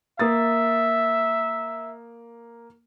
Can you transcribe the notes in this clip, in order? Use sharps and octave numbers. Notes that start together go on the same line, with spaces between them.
A#3 E5 D#6 A6